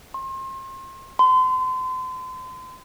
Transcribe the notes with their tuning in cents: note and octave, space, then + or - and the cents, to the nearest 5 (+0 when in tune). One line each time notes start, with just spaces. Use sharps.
C6 +35
C6 -35